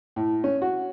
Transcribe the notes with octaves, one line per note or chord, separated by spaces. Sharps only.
A2
C#4
F#4